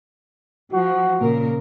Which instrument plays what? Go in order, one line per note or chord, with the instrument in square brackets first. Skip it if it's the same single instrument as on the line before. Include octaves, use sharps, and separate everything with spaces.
[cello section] F3 [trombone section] F#4
[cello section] A#2 C#3 A#4